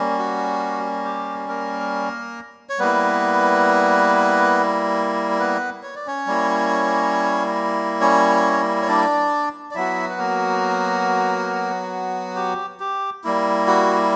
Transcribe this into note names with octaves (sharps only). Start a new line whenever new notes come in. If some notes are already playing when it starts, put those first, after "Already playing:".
Already playing: G3 A#3 C#4
F#4
G4
A#3 A#4
C#5
G3 A#3 B3 E4 B4
B3 B4
C#5
D5
C#4 C#5
G3 A#3 E4
C#4 C#5
C#5
D4 D5
D5
F#3 B3 E4 F#4 E5
B4
A#3 A#4
G4
G4
G3 A#3 E4
F#4